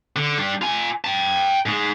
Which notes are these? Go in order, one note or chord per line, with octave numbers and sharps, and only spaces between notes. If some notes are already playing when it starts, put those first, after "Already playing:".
D3
G3 D4
F4 G#5
G5 A5
G#2 G#3